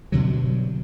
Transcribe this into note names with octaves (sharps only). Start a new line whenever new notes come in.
G2 B2 D3 F#3